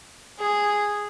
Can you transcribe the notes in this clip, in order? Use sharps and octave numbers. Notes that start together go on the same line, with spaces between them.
G#4